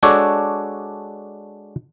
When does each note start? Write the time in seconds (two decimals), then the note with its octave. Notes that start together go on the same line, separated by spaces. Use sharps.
0.03 G#3 D4 F#4 A4 C#5 D5